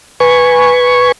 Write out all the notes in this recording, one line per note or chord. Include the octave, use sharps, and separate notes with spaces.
B4 G#5 C#6